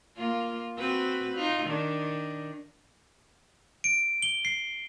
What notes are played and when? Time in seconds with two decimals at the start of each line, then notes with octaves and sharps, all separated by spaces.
0.17 A#3 F4
0.78 C4 F#4 B4
1.34 D#4 F4
1.66 D#3 D4
3.84 D7
4.22 G7
4.45 C7